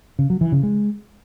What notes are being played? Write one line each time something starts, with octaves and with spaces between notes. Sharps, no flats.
C#3
F#3
E3
C#3
G#3